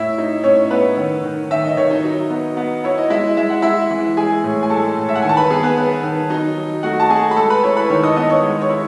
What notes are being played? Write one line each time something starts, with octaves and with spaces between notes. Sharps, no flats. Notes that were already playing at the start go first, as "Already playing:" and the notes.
Already playing: A2 E4 E5
D#4
A2 C#4 C#5
A2 B3 B4
D#3
D#3
D#3 E5
D#5
D#3 C#5
D#4 D#5
F#3
B3
B3
E4 C#5
D#5
G#3 E4 E5
G#3 E5
F#5
G#3 E4 E5
E3
G#3 G#4 G#5
A2
G#5
G#3 A4 A5
A2
E5
F#5
D#3 G#5
A5
B4 B5
B3 G#4 G#5
B3 B4
B3 B4
D#3
F#3 D#4 D#5
F#3
A3 F#4 F#5
A5
A3 G#4 G#5
B5
G#3 A4 A5
B4 B5
E4 C#5 C#6
B4 B5
D#3 C#5 C#6
D#5 D#6
B3 D#5 D#6
C#5 C#6
G#3
C#5 C#6
E4